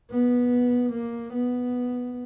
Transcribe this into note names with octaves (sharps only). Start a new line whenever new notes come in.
B3
A#3
B3